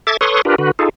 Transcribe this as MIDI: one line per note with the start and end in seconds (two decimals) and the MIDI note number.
0.07 0.17 69
0.07 0.17 76
0.07 0.17 86
0.07 0.17 92
0.07 0.17 93
0.21 0.42 69
0.21 0.42 71
0.21 0.42 73
0.21 0.42 84
0.21 0.42 85
0.21 0.42 87
0.45 0.56 62
0.45 0.56 65
0.45 0.56 67
0.45 0.56 70
0.45 0.56 71
0.58 0.71 50
0.58 0.71 66
0.58 0.71 71
0.79 0.89 63
0.79 0.89 65
0.79 0.89 68
0.79 0.89 69